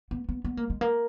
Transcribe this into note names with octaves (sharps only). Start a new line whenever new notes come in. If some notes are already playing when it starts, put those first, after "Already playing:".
B3
B3
B3
A#3
G#3
A#3